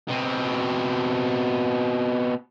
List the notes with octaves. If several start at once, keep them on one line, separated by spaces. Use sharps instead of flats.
B2 C4